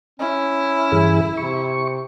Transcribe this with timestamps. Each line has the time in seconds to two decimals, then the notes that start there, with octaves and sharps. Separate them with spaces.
0.20 C#4 E4
0.92 G2 E3 G#4
1.37 C3 C#6